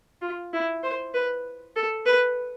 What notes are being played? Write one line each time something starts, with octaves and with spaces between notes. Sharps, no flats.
F4
E4
C5
B4
A4
B4